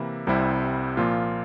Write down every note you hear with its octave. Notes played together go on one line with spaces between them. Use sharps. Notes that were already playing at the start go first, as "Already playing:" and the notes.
Already playing: C3 E3 A#3 E4
C2 C3 G3 C4 E4
A#2 F3 A#3 F4